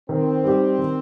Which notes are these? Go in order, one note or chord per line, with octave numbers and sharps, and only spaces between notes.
D#3 C4
G3 D#4 G4
D#3